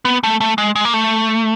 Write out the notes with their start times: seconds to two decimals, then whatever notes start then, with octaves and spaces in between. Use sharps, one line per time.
0.05 B3
0.23 A3
0.41 A3
0.58 G#3
0.76 G#3
0.85 A#3
0.94 A3